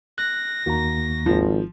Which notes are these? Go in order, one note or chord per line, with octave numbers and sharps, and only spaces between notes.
F#6 A#6
D#2 D#3 A#3 F#4 A#5
G#1 F3